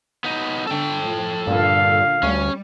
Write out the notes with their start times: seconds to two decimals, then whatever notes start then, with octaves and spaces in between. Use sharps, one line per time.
0.24 B3 D#4
0.67 D3 A4 G5
1.05 A2 F3
1.47 G2 A#2 D3 F5
2.23 D2 G3 C#4